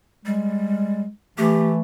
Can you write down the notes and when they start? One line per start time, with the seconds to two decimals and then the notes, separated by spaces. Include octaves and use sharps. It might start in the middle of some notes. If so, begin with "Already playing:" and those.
0.26 G3 G#3
1.38 E3 A3 G4